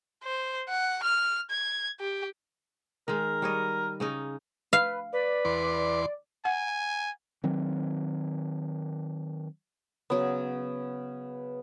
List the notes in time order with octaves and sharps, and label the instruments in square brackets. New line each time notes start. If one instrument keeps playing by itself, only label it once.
[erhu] C5
F#5
F6
G#6
G4
[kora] D#3 G#3 [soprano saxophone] A#4
[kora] G3 C#5 D#5
C#3 C#4 D#4
[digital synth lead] B4 [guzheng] F5
[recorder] B4 [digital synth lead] D5
[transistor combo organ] E2 C6 D6
[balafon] F#5 [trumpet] G#5
[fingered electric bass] D#3 F#3 C4
[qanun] C#3 F#3 [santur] B3